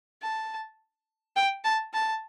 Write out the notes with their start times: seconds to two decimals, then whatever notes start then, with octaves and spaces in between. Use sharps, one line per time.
0.22 A5
1.36 G5
1.64 A5
1.93 A5